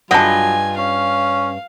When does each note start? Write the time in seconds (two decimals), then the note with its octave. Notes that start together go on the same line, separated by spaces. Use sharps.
0.11 G2 F#3 F4 D#5 F#5 G#5 A5
0.78 C#4 F5